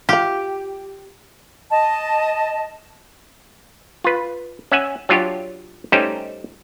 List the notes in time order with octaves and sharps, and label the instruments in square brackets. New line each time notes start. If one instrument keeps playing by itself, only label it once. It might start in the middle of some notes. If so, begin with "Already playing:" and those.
[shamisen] F4 F5 [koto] G4
[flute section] D#5 A5
[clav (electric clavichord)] F4 B4
C#4 E5 F#5 G#5
F#3 D4 F4 G4 C#5
G3 A3 C#4 D#4 G4 C5